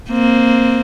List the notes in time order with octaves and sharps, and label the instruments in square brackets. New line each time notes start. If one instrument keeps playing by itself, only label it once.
[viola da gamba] A#3 C4